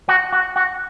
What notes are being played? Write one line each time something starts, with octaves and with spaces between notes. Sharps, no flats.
F#4
F#4
F#4